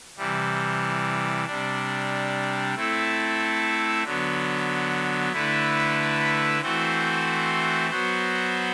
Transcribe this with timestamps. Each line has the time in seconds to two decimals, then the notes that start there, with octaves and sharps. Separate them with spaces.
0.17 C3 E3 G3
1.46 C3 G3 D4
2.75 A3 C4 E4 A4
4.03 D3 F#3 B3
5.32 D3 A3 E4 B4
6.61 E3 A3 C4 F#4 C5
7.90 F#3 B3 F#4 C5